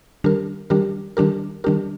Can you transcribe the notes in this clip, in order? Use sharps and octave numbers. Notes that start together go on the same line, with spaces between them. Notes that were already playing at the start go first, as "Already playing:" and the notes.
D#3 G3 D4 G4 A#4
D#3 G3 D4 G4 A#4
D#3 G3 D4 G4 A#4
D#3 G3 D4 G4 A#4